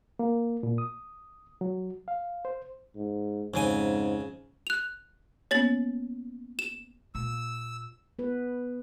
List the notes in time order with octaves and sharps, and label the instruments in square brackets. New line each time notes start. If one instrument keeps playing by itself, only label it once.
[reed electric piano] A#3
A#2
D#6
F#3
F5
C5
[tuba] G#2
[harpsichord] F2 C#3 G#5 [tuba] G#2
[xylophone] F#6 F7
[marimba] A#3 B3 C#4 [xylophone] C#5 A6 F#7
[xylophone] E7
[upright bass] A#2 [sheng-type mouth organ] E6
[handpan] B3 B4